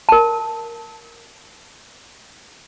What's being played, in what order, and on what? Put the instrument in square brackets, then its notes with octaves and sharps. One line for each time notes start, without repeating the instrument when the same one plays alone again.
[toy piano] A#4 A5